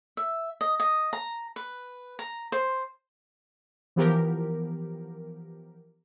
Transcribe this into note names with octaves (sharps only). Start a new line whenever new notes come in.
E5
D#5
D#5
A#5
B4
A#5
C5
E3 F3 B3 G4 A#4